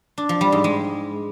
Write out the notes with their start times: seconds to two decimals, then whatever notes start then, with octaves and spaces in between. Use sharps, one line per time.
0.18 D4
0.29 F3
0.41 G3
0.52 G#2
0.64 G#3